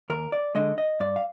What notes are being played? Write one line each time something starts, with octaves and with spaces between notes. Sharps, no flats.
D#2 A#4
D5
D3 G#3 D#5
D#5
G2 D5
F5